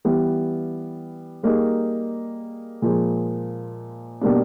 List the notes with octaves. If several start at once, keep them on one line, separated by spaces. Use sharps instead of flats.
E3 G3 B3
G3 A#3 D#4 G#4
A#2 F3 G#3
B2 G3 A#3 D4